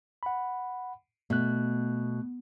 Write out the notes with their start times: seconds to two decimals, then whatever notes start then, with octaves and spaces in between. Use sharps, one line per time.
0.23 F#5 B5
1.30 B2 A3 F#6